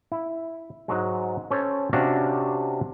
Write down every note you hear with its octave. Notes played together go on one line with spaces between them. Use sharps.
E4
G#2 F#3 G#3
C#4 A4 C5 C#5
C3 C#4 D4 F#4 G4 F5